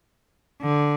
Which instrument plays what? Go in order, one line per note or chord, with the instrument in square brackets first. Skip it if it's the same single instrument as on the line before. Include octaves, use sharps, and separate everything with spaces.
[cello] D3